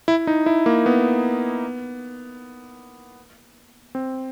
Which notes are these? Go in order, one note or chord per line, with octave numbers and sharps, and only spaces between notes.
E4
D#4
E4
A#3
B3
C4